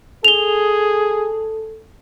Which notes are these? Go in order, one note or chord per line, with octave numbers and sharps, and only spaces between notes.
G#4 A4 F7 G7